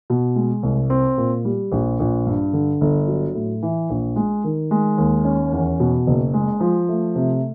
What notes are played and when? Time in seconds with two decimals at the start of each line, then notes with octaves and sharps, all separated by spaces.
0.10 B2
0.36 G#3
0.63 C2
0.90 C4
1.18 A#2
1.45 G3
1.72 A#1
2.00 A#1
2.26 G2
2.53 D3
2.81 G1
3.07 F#3
3.35 A2
3.63 E3
3.90 A#1
4.16 G#3
4.44 D#3
4.71 G#3
4.98 D#2
5.25 C#4
5.52 E2
5.80 B2
6.07 F#1
6.34 G#3
6.60 F3
6.89 A3
7.16 C3